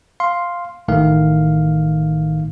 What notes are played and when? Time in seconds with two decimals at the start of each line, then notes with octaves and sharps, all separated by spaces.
0.20 F5 C6
0.88 A1 A2 D#3 A3 F5